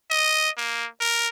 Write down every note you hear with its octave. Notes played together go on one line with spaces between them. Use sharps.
D#5
A#3
A#4